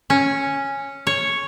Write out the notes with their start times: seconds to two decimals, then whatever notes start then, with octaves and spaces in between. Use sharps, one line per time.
0.10 C#4
1.07 C#5